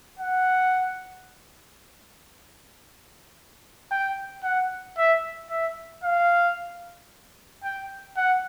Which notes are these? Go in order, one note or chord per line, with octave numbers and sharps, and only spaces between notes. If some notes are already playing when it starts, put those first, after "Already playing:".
F#5
G5
F#5
E5
E5
F5
G5
F#5